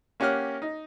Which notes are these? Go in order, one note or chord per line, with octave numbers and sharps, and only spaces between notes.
A#3 C#4 G4 F#5 F6 F#6
D#4